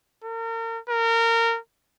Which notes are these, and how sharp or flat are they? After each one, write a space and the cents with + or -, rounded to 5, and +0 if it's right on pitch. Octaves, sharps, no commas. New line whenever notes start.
A#4 -35
A#4 -25